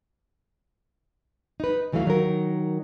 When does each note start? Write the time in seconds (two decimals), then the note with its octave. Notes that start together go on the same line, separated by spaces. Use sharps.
1.60 D#4 B4
1.92 D2 E3 F#3 A3 F5
2.06 D#3 F#3 D#4 A#4